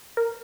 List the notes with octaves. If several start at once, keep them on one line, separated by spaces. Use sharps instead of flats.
A#4